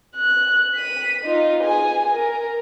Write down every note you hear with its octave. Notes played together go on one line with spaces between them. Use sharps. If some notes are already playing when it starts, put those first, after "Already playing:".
F#6
B6 D#7
D#4 F4
G#4 G#5
A#4